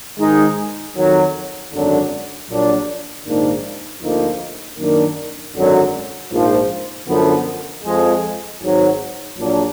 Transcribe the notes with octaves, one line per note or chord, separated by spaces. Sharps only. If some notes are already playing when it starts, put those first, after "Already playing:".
G#2 D#3 G#3 D#4
F2 D#3 F#3
G#1 F#2 D3 F#3 D4
A#1 A#2 F#3 D4
A#1 G#2 D#3 A#3 D4
D2 D3 F3 A#3 D#4
F#2 D#3 A#3 D4
G#1 F#2 D3 F#3
A#1 G#2 F3
F#2 D3 F3 B3
F2 F3 G#3
G#1 G#2 F#3
A#1 A#2 F#3 D4